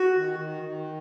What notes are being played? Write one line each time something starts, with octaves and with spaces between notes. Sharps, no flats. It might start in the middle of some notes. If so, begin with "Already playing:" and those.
Already playing: F#4
D#3
D#3
D#3